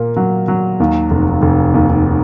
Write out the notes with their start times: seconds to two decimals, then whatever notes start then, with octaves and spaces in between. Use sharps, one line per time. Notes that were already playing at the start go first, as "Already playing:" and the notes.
Already playing: A#2 A#3
0.16 F#3
0.48 F#3
0.80 D#2
1.10 F1
1.42 F1
1.74 D#2